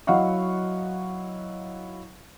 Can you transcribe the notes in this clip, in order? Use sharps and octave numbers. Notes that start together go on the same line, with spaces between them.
F#3 E4 D#5 F5 F#5 C#6